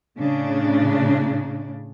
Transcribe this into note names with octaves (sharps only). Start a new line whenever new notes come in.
A2 C#3 D4